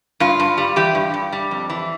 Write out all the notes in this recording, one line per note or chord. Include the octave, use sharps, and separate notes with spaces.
G2 F4
G2
G3
E3 G4
G2
G2
G3
F2
E3